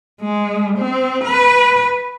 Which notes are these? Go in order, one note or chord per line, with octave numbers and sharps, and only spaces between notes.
G#3
C4
B4